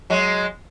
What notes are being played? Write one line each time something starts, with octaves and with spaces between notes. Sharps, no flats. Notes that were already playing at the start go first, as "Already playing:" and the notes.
F#3 G#3